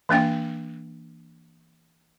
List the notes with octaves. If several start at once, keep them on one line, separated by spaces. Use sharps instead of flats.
E3 A#3 D4 G5